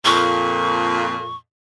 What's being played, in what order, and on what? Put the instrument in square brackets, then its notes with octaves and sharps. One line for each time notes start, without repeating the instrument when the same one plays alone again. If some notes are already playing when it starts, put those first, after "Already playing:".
[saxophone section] F2 A#2 [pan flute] C#6